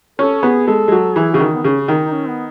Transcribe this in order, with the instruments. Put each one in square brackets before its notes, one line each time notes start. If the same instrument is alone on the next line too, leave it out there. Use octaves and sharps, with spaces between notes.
[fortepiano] C#4 [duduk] A4
[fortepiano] B3 [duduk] G#4
[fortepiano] G#3 [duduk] A4
[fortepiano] G#3
F#3
[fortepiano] E3 [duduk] G#4
[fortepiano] C#3 [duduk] F#4
[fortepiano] D#3
[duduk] B3
[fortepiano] C#3 [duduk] C#4
[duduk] C#4
[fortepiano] D#3
[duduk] D#4
D#4
C#4
B3